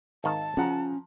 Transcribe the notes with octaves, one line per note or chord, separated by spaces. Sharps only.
G#1 D#3 F5 A5
C#3 F3 C#4 F#5 A#5